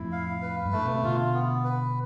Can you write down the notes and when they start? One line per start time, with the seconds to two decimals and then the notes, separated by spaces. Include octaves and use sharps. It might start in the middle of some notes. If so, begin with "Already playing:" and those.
Already playing: F2 A2 E4
0.12 F5
0.42 B4
0.66 G2
0.73 A2 A3
0.85 B2
0.94 C3
1.04 B2 D3 F4
1.34 B3
1.64 B4